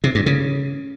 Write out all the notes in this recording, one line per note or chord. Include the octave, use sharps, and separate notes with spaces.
C3
G2
C#3